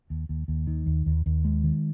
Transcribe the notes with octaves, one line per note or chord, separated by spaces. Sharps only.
D#2
D#2
D#2
D#3
D#2
D#2
D#2
G#3
D#3